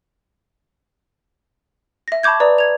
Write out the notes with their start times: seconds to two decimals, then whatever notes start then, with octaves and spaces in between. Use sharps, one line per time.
2.08 E5 A#6
2.23 A5 B5 C#6 D6 G6 G#6
2.40 B4 D5 A#5 D#6
2.58 G#6 F7